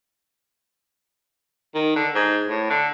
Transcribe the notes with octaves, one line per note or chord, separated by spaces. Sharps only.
D#3
D3
G#2
A2
D3